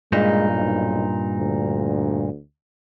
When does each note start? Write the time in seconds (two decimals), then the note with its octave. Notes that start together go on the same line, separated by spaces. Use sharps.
0.13 G2 A#2 G#3 D#4
0.51 B1
1.38 D2